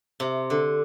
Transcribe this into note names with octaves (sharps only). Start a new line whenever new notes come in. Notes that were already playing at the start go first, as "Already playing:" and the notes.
C3
D3